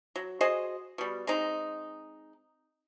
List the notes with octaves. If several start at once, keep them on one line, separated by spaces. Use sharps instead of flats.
F#3
F#4 G#4 C5 D#5
B2 G3
G#3 C4 D#4